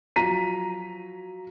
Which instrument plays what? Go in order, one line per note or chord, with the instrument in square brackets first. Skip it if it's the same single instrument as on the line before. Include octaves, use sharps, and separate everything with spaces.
[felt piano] F3 F#3 A#5 B6 D#7